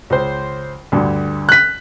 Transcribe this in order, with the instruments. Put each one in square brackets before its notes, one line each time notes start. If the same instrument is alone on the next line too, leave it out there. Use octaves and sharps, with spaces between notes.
[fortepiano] C#2 C5
D2 G2 D3
[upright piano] F#6 B6